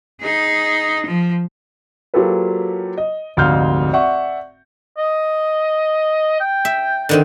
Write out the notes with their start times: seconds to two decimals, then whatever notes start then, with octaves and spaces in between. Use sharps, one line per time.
0.21 D#4 G#4
1.06 F3
2.14 F#3 A#3 F4 G4 A4 B4
2.98 D#5
3.37 F1 D2 G#2 F5 F6 G6
3.93 D5 E5 F#5 C#6
4.98 D#5
6.40 G5
6.65 E5
7.09 D3 D#3 C4